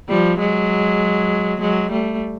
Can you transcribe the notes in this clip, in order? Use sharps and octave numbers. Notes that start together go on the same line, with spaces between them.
F3 G3
F#3 G#3
F#3 G#3
G3 A3